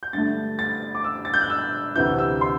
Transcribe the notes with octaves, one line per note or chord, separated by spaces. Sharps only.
G6
G2 D3 A3 A6
A6
D6
E6
A6
G6
F#6
E6
D2 C3 E3 G6
E6
C6